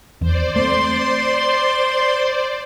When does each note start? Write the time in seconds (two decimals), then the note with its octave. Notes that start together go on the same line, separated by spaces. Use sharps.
0.21 E2 C5 D5
0.56 A3 C4 C6